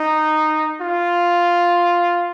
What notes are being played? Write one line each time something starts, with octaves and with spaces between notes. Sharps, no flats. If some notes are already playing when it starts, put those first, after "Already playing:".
Already playing: D#4
F4